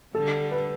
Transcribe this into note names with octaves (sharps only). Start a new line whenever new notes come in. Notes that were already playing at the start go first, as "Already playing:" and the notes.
D3 G3 A4
B4